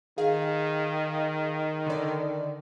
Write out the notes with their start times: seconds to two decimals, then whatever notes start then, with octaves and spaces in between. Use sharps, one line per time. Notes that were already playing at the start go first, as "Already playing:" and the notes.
0.18 D#3 G#4 F5
1.86 D3 D5